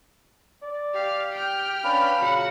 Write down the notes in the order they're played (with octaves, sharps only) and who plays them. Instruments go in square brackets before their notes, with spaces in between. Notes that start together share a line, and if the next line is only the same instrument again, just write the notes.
[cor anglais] D5
[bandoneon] G4 [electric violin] F5
[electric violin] G5 F6
[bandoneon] C#4 D4 B4 [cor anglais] F5 [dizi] B5
[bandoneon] A#2 C#3 F#3 [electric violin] F#4 F#5